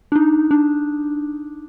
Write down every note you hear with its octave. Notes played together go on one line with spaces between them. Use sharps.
D4
D#4
D4